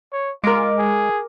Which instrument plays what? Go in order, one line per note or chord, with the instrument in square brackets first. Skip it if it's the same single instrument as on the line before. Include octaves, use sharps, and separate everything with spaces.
[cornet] C#5
[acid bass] G#3 [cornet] F4 [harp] A#4 D6
[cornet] G#4